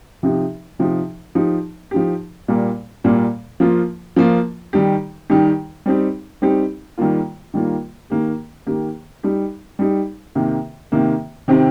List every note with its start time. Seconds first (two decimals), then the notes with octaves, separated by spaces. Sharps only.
0.23 C3 F3 D#4 G4
0.79 C3 F3 D#4 G4
1.35 F3 D#4 G4
1.91 F3 D#4 G4
2.48 A#2 G3 A#3
3.04 A#2 G3 A#3
3.60 F3 A#3 F4
4.16 F3 A#3 F4
4.73 D#3 G3 D#4 G4
5.30 D#3 G3 D#4 G4
5.86 G3 C4 D#4 G4
6.42 G3 C4 D#4 G4
6.98 D#3 G3 A#3 F4
7.54 D#3 G3 A#3 F4
8.10 D#3 A#3 G4
8.67 D#3 A#3 G4
9.23 G3 D#4 G4
9.79 G3 D#4 G4
10.35 C3 D#3 A#3
10.92 C3 D#3 A#3
11.48 C3 D#3 C4 G4